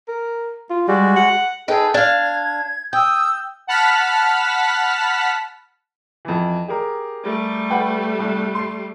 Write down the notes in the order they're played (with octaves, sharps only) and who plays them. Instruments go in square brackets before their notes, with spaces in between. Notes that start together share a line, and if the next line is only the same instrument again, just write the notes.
[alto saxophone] A#4
F4
[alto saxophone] G3 [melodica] G#3 F#4
[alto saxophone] F#5
[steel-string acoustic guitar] D#4 B4 G5 [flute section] G#4 A4
[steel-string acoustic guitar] D4 F5 [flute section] G#6
[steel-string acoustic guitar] G5 [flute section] D#6 E6 G6
[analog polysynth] F#5 A5 B5 F6 B6
[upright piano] F2 E3
G4 G#4 A#4
[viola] G3 A3
[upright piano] B4 F#5 G5
C2
C6 C7